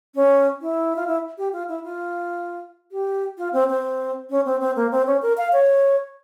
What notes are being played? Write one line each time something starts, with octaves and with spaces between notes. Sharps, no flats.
C#4
E4
F4
E4
G4
F4
E4
F4
G4
F4
C4
C4
C#4
C4
C4
A#3
C4
C#4
A#4
F5
C#5